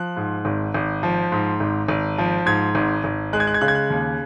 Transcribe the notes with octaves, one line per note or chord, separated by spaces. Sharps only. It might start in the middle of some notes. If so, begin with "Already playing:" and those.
Already playing: F3 F#6
G#2
G#1
G#1
F3
G#2
G#1
G#1
F3
G#2 G#6
G#1
G#1
G#3 F#6
G#6
F#6
G#6
C#3 F#6
G#6
F#6
D#2